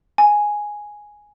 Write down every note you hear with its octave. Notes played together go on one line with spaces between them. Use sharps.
G#5